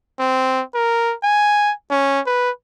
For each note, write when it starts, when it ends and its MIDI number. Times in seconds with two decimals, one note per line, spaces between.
0.19 0.62 60
0.75 1.15 70
1.23 1.72 80
1.91 2.20 61
2.26 2.50 71